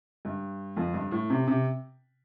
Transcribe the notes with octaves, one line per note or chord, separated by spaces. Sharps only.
G2
F2
G2
A2
C3
C3